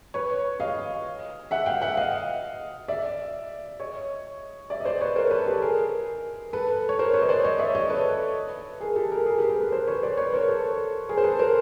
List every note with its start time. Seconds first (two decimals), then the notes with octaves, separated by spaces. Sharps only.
0.14 B4 C#5
0.60 D#5 F5
1.51 E5 F#5
1.66 F5 G5
1.82 E5 F#5
1.97 D#5 F5
2.88 D5 E5
3.80 C#5 D#5
4.70 D5 E5
4.80 D#5
4.85 C5 D5
5.01 B4 C#5
5.16 A#4 C5
5.31 A4 B4
5.46 G4 A4
5.62 G#4 A#4
6.53 A4 B4
6.89 C#5
6.99 A#4 C5
7.13 B4 C#5
7.21 D#5
7.29 C5 D5
7.44 C#5 D#5
7.59 D5 E5
7.75 C#5 D#5
7.90 A4 B4
8.81 G#4 A#4
8.96 G4 A4
9.12 G#4 A#4
9.26 G#4 A#4
9.38 G4 A4
9.44 B4
9.49 G#4 A#4
9.60 A4 B4
9.72 A#4 C5
9.87 B4 C#5
10.03 C5 D5
10.17 B4 C#5
10.33 A#4 C5
10.48 A4 B4
11.09 G#4 A#4
11.18 C5
11.24 A4 B4
11.39 A#4 C5